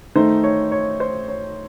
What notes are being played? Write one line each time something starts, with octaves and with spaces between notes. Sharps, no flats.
D#3 A3 D#4 C5
C#5
C#5
C5
C#5